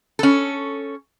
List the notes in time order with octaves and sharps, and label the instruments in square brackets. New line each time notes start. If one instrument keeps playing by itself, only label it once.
[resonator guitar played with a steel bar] C#4 A4